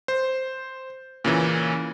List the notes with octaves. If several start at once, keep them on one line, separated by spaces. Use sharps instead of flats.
C5
A#2 C#3 E3